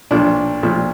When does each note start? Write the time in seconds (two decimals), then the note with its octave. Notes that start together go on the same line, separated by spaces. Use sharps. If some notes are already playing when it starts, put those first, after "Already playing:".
0.11 B1 A#2 F3 D4
0.63 B1 A#2 F3